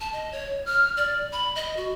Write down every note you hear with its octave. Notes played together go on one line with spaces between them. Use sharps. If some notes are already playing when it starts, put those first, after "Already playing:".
A5
D#5
C#5
F6
D5
B5
D#5
F#4